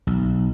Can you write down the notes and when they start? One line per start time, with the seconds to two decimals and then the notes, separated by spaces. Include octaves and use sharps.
0.07 B1